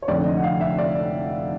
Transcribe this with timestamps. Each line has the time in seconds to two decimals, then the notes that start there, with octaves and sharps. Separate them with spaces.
0.02 C#5
0.08 F1 F2 D3 D5
0.26 D#5
0.36 F#5
0.44 F5
0.61 E5
0.78 D5